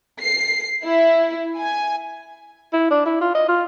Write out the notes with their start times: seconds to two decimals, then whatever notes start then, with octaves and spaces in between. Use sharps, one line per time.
0.20 C7
0.84 E4
1.59 G#5
2.73 E4
2.91 D4
3.06 E4
3.21 F4
3.35 D#5
3.49 F4